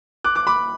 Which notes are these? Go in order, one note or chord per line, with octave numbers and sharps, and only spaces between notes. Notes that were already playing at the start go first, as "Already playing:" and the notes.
D6 F#6
D6 F#6
B5 D6